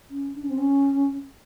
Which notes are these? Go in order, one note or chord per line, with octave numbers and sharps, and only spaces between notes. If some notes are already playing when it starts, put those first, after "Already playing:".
C#4
D4
C#4
C4
C#4